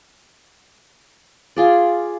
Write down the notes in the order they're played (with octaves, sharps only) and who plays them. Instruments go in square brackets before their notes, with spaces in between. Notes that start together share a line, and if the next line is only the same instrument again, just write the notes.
[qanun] F4 G#4 D5